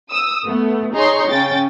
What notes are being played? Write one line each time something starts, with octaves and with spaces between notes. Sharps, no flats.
D#6 E6
A3 B3
D#4 G#4 C#5 A#5 C6 C#6
C#3 C#4 G5 A6